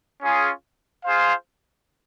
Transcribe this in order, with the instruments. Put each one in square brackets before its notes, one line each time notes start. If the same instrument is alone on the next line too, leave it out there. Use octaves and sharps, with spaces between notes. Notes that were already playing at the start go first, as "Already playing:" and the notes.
[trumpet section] C#4 F4 G#4
F4 G#4 C5 F5